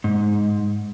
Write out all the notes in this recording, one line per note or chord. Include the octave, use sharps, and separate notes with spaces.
G#2